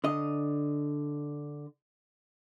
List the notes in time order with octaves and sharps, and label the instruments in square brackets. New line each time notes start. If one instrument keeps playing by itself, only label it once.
[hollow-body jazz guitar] D3 D#5